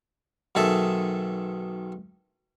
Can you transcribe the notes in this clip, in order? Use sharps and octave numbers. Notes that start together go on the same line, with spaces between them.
B1 D#3 G#4 A4 E5